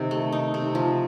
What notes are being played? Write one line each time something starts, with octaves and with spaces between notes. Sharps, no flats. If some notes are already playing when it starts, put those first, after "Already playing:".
Already playing: C3 D#3
A3
D#4
C3
F3